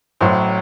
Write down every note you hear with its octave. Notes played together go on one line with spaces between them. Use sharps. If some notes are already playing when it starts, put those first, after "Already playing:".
A1 A2 F#3 C5